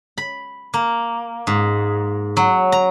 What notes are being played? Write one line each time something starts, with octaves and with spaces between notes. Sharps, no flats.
B5
A#3
G#2
F#3
A#5